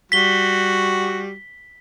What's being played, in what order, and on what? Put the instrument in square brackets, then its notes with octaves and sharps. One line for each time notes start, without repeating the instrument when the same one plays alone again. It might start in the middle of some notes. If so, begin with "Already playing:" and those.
[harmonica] G3 F#4 [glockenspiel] B6 G7